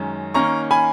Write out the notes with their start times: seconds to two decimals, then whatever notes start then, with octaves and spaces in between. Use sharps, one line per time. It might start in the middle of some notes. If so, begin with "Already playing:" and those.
Already playing: F#2 D#3 G#3 C#4
0.34 D#3 A#3 C#4 A#5 C#6
0.71 G#5 B5